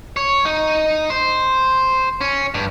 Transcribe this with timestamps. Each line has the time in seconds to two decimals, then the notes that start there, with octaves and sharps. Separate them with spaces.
0.17 C#5
0.45 D#4
1.10 C5
2.21 C#4
2.54 G2